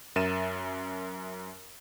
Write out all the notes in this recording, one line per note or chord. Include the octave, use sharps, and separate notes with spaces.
F#2 A#4 E5 A6 D#7 E7